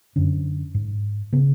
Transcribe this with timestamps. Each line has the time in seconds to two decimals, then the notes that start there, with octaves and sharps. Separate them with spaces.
0.16 F#2 D3 C#4
0.74 G#2
1.33 C#3 B3